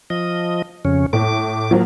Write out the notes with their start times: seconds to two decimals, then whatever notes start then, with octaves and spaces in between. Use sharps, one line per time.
0.10 F3 D#5
0.85 F2 C#3 C#4
1.13 A2 D6
1.71 F3 F#3 A#3